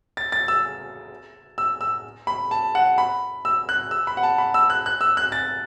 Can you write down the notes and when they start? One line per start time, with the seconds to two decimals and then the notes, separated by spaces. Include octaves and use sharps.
0.17 A6
0.32 A6
0.48 E6
1.58 E6
1.81 E6
2.27 B5
2.51 A5
2.75 F#5
2.98 B5
3.45 E6
3.69 F#6
3.91 E6
4.07 B5
4.17 F#5
4.23 A5
4.38 B5
4.54 E6
4.70 F#6
4.86 F#6
5.01 E6
5.17 F#6
5.32 A6